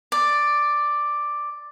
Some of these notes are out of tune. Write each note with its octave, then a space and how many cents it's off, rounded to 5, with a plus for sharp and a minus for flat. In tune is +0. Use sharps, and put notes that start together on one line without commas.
D5 +5